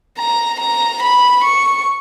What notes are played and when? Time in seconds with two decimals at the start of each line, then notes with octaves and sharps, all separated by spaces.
0.18 A#5
0.60 A#5
1.03 B5
1.44 C#6